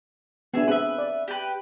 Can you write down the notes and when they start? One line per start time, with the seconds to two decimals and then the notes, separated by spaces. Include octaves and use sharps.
0.54 B3 C#4 D4 G#4 E5
0.68 C4 G#4 B4 E5
0.98 D5
1.28 G4 B4